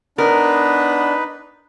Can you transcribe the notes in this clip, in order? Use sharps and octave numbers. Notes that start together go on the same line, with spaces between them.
B3 D4 D#4 A#4 B4